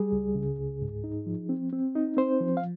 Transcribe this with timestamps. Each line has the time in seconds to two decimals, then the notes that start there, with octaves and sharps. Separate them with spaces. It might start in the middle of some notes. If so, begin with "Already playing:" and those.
Already playing: G3 G#4
0.12 C#2
0.35 C#3
0.59 C#2
0.82 G#2
1.04 D#4
1.26 F3
1.49 C4
1.73 C4
1.95 D#4
2.17 C4 C5
2.40 F3
2.57 F5